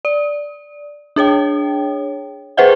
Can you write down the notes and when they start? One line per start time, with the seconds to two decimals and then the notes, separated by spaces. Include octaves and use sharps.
0.05 D5
1.16 D4 G#4 C#5 G5
2.57 G#4 B4 C5 E5 F#5 G5